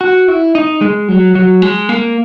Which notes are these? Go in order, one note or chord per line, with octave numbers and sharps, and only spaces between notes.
F#4
E4
D#4
G#3
F#3
F#3
G#3
A#3